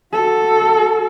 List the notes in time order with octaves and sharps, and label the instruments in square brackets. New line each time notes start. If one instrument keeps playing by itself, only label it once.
[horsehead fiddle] F#4 A4